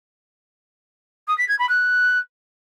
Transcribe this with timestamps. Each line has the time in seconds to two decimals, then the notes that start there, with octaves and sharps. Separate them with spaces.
1.27 D#6
1.38 B6
1.48 G#6
1.58 B5
1.69 F#6